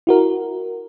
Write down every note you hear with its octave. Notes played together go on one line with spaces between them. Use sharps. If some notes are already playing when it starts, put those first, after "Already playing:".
E4 F#4 A#4